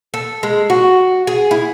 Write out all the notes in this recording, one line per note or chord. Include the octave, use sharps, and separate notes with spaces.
A4
G#3
F#4
G#4
E4